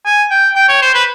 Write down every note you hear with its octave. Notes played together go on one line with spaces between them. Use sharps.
G#5
G5
G5
C#5
C5
B4